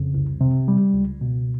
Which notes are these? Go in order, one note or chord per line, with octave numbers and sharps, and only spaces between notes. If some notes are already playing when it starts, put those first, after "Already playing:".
Already playing: F2 C#3
C2
C3
G3
C#2
B2